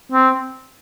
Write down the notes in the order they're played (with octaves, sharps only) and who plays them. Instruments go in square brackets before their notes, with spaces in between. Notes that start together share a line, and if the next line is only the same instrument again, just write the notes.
[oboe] C4